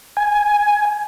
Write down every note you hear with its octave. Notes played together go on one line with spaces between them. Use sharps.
G#5